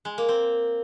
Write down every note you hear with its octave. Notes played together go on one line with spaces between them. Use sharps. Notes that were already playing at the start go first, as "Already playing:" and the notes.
G#3
A#3
C4